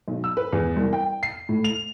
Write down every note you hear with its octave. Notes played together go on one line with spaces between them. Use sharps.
B1
E6
B4
E2
C2
G5
C7
A2
F7